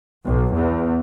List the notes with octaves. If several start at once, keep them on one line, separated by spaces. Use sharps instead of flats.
B1
E2